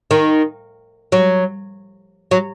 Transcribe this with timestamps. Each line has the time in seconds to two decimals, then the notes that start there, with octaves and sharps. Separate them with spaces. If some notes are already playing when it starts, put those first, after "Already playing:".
0.11 D#3
1.12 F#3
2.31 F#3